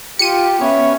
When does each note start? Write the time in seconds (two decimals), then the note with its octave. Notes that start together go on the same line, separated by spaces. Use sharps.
0.19 F4 G4 C#7 D#7
0.61 B3 C#4 E5